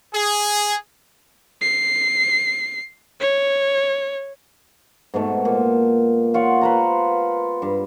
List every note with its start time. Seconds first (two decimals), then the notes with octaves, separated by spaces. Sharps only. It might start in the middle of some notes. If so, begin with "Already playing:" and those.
0.14 G#4
1.61 C7
3.21 C#5
5.14 G#2 B2 A3
5.45 A#2
6.34 F4 C#5 F#5
6.61 B4 C5 A#5
7.62 G2